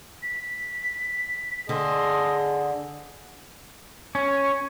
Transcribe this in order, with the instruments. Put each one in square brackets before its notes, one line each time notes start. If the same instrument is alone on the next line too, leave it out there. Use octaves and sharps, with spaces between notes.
[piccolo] B6
[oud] D3 [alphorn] G#4 [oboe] D#5 [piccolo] C6
[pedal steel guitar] C#4